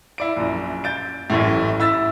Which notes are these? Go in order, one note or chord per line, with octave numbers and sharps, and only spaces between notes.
E4 D5 D7
A#1 F#2
G6 A6 D7
A1 F#2 A2
E4 E6 A6 B6